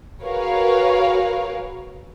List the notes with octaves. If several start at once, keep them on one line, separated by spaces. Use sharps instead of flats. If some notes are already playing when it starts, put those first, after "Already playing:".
F#4 G#4 A#4 B4 C#5 F5